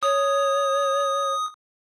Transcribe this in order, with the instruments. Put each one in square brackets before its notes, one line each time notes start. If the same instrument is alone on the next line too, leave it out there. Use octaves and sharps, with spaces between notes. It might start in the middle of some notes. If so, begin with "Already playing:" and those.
[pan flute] C#5 [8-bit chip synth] D#6